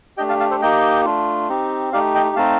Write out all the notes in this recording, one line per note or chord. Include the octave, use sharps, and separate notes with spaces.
A3 D4 G4 D#5 G5
F5 A5
F5 A5
A4 C5
A#3 D#4 G4 D#5 G5
A3 D4 F4
C4 D#4 G4
A3 D#4 G4 D5 F5
D#5 G5
A3 C4 D#4 F5 A5